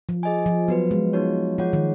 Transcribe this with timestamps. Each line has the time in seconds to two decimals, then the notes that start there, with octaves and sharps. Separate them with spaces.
0.09 F3
0.23 G#4 D#5 G#5
0.46 F3
0.68 F#3 B3 F#4 B4
0.91 G#3
1.13 B3 D#4 F#4 C#5
1.58 F3 F4 G#4 C#5 F#5
1.73 D#3